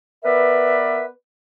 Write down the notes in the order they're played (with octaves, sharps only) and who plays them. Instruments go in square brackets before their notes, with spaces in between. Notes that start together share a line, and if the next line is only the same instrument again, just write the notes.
[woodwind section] B3 A#4 B4 D5 E5